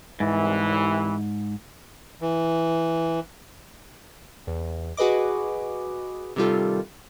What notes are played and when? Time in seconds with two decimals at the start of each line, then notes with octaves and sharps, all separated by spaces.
0.20 C2 G#2 E3
2.21 E3
4.47 E2
4.97 F#4 G#4 B4 D#5 D6
6.36 C3 D#3 G3 F4 A4